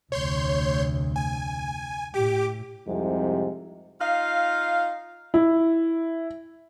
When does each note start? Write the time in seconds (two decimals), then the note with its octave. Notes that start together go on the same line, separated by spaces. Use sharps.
0.12 F1 D2 C#5 C6 G6
1.16 G#5
2.14 A2 G4 D6
2.87 C2 F2 G#2 C3
4.01 D#4 F4 F5
5.34 E4